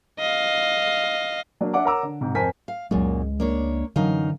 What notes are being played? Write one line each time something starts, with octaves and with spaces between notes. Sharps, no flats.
D#5 F5
F#3 A#3 D4
D4 E5 F#5 D6
A#4 C#5 F#5 A#5 D6 E6
D3
G#2 C3
F2 A#4 C5 G#5 A5 B6
F5
C#2 F#2 A#2 G#3
A#3 D4 C#5
F#2 D3 E3 D#4 F5